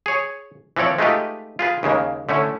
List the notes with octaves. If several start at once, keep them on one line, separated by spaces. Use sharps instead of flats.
G#4 C#5
E3 F3 C4 C#5 D5
G#3 A3 D#4 F4 G4 B4
F4 G#4 B4
D#2 C#3 G#3 A#3
D3 A3 C#4 E4